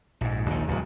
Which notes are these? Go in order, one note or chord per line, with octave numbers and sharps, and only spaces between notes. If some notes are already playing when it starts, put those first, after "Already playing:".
A#1 G#2
A#1 D#2 D3 D#3
D1 C#2 C3 F#3